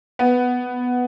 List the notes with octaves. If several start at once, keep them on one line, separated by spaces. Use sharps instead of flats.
B3